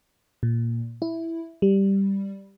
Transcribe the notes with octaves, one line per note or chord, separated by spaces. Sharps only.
A#2
E4
G3